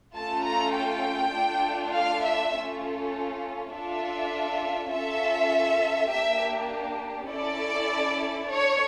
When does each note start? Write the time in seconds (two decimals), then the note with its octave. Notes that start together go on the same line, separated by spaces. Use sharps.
0.16 A3 C#4 F4 A4 A5
0.45 A#5
0.75 G5
1.35 A3 D4 F4 A4
1.94 F5
2.24 E5
2.54 A3 C#4 F4 A4
3.72 D4 F4 A4 E5
4.91 C#4 F4 A4 E5
6.10 A#3 D4 G4 E5
7.29 C#4 E4 A4 D5
8.48 D4 A4 C#5